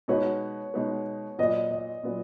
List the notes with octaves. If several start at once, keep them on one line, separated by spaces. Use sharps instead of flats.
B2 G#3 D#4 F#4 B4 C#5
B2 G#3 D#4 F#4 B4
A#2 F#3 B3 F4 D#5
D#5
A#2 F#3 B3 F4